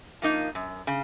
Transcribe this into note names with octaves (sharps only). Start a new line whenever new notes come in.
F3 A#3 D#4
F#2
C#3